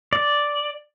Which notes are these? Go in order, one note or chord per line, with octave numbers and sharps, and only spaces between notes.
D5